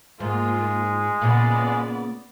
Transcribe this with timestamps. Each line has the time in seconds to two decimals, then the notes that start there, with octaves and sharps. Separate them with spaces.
0.20 G#2 G#3 A#3 F4
1.22 A#2 C#3 B3 D5